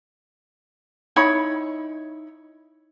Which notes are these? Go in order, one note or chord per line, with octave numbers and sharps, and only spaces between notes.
D#4 E4 C#5 B5